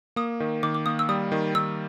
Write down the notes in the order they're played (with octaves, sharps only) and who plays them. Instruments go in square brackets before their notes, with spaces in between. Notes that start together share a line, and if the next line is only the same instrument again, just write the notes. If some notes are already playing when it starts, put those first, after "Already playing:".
[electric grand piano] A#3 [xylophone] D#6
[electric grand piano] D#3
[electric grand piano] D#3 [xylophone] D6
[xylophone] D6
[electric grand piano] A#3 [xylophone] D#6
[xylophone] E6
[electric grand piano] G3 [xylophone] D#6
[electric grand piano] D#3
[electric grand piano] D#3 [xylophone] E6